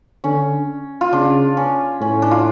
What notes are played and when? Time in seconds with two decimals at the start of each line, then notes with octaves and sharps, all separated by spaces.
0.24 D3 C#4
1.01 F4
1.13 C#3 D4
1.57 C#4
2.01 A2 C#4
2.22 D4
2.31 F4